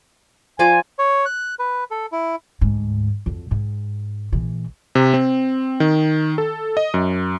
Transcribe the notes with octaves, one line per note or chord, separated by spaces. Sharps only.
F3 D5 G#5 D6
C#5
F#6
B4
A4
E4
D2 G#2
F2 F#3
G#2
A#1 E3
C3
C4
D#3
A4
D#5
F#2